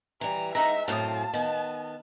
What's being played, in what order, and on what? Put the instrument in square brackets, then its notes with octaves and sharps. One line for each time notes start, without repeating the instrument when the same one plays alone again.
[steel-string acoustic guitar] E3 G3 [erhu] A#5
[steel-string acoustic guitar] G#3 [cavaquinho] D#4 F#5 A#5 [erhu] E5
[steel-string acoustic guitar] F#2 A2 C4 [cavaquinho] F5 D#6 [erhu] A5
[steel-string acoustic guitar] D#3 B3